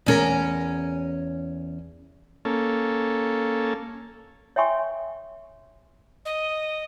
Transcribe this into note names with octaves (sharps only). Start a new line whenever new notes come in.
E2 C#4 A#4
A#3 C#4 A4
C#5 E5 G5 G#5 C6 C#6
D#5